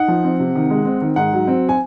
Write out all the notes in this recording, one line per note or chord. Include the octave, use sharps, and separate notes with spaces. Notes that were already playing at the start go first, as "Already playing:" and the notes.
Already playing: D#4 F#5
F3
C4
C3
D#3
G#3
C4
D#3
G#2 F#5
F#3
C4
G#5